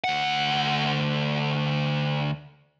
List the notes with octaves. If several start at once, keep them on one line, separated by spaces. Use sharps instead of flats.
D2 F#5